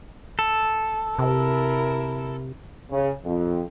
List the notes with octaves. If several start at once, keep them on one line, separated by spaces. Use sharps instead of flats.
A4
C3 E4 A#4
C#3
F2